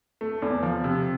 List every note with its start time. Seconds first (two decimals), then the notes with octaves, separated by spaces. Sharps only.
0.21 A3
0.42 E2
0.63 F3
0.84 C3